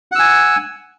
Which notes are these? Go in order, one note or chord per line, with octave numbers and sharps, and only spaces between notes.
F#5 G#5 E6